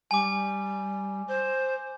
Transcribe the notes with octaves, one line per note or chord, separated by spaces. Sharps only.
G3 G#5 D6
C5